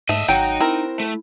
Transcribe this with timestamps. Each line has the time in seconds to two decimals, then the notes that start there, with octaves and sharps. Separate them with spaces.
0.09 G#2 A3 D#5 E5
0.28 G#1 F#3 D#4 F#4 G5
0.60 C4 E4 A#4
1.00 A3